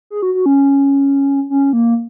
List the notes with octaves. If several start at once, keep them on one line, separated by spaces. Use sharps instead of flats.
G#4
F#4
F#4
C#4
C#4
A#3